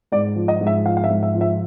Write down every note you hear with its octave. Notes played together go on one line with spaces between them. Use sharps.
G#2 D5
F3
D#5
G#2
E5
F3 F5
F5
E5
G#2
E5
F3
E5